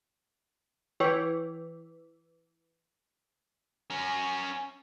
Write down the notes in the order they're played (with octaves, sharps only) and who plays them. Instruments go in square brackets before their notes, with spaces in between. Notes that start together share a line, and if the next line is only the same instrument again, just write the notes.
[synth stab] E3 [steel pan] C#5 G5 C#6
[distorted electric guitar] C#4 A#4